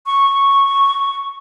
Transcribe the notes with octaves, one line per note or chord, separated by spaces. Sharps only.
C#6